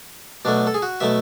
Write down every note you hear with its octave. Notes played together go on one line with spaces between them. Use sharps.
B2 F#3 A3 D4
A4
G#4
F#4
B2 F#3 A3 E5